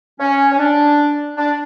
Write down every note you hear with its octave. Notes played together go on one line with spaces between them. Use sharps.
C#4
C#4
D4
D4